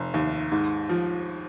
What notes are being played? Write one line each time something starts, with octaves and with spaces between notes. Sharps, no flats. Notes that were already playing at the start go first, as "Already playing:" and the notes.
Already playing: F1
D#2
G#2
F3